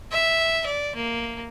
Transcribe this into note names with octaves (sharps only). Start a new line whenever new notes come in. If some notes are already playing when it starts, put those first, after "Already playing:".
E5
D5
A#3